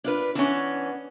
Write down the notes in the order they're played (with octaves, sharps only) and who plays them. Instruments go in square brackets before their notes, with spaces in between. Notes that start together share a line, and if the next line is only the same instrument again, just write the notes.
[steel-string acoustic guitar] D4 F4 B4
[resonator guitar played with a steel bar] E3 C#4 [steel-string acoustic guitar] B3 D4